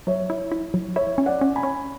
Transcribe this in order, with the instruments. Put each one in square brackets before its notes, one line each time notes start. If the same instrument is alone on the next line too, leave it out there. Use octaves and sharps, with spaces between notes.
[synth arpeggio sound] F#3 [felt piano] C#5 E5
[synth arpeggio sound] E4
E4
F#3
[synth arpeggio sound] E4 [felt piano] C#5 E5
[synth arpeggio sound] C#4
[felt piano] D5 F#5
[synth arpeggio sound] C#4
[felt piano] G#5 B5
[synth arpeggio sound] C#4